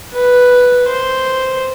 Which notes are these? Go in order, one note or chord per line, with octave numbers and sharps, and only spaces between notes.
B4
C5